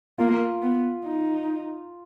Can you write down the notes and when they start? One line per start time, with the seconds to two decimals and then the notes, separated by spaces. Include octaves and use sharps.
0.18 A#3 F4
0.62 B3
1.05 D#4